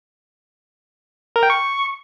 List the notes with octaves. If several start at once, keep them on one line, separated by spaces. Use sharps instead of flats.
A#4
G5
C#6